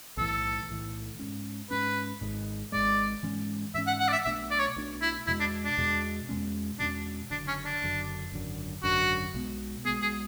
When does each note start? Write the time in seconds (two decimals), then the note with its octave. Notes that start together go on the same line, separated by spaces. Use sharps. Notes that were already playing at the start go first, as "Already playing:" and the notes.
0.17 B1 A2 E3 A4
0.69 B1 A2 E3
1.19 G#2 G#3 C#4
1.70 G#2 G#3 C#4 B4
2.21 G#1 G#2 G#3
2.72 G#1 G#2 G#3 D5
3.23 G#2 E3 G#3 C#4
3.74 G#2 E3 G#3 C#4 E5
3.87 F#5
4.00 F#5
4.08 D5
4.12 E5
4.25 B1 B2 A3 D4 E5
4.51 D5
4.59 C#5
4.76 B1 B2 A3 D4
5.02 E4
5.27 E2 B2 G#3 E4
5.40 D4
5.65 D4
5.78 E2 B2 G#3
6.29 E2 B2 G#3 C#4
6.79 E2 B2 G#3 C#4 D4
7.31 F#1 F#2 D3 D4
7.48 C#4
7.65 D4
7.82 F#1 F#2 D3
8.32 G#1 F#2 D3
8.83 G#1 F#2 D3 F#4
9.34 B1 B2 G#3 B3
9.85 B1 B2 G#3 B3 G#4
10.02 G#4